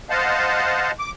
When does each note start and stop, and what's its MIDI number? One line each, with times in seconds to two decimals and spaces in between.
0.10 0.91 72
0.10 0.91 75
0.10 0.91 77
0.10 0.91 78
0.10 0.91 81
0.99 1.11 86